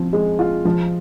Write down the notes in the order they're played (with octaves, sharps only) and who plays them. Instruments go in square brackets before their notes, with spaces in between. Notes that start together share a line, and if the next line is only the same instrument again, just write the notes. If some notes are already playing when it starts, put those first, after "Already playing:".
Already playing: [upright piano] F3 C4
G#3
F4
F3